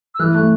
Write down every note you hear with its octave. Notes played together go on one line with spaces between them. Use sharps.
E6
E3 F#6
A3